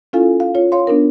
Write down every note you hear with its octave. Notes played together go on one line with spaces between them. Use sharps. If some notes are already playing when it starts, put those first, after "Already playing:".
C#4 E4 F4 A4 F5 G#5
F5
F4 C#5
C#5 F5 C6
B3 D4 D#4 A#4